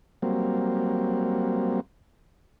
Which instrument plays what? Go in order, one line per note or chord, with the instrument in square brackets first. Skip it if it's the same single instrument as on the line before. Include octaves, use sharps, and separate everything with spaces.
[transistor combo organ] F#3 G3 A#3 C4